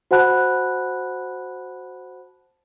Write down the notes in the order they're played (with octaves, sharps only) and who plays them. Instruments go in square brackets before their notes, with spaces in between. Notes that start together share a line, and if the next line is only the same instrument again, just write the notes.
[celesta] F#4 C5 F#5 A5 B5 F#6